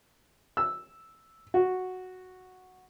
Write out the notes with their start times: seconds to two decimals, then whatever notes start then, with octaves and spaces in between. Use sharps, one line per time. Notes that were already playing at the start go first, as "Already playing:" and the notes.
0.57 E6
1.54 F#4